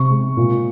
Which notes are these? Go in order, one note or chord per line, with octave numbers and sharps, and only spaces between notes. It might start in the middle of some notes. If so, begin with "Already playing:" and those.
Already playing: C3 C#6
G#3
A#2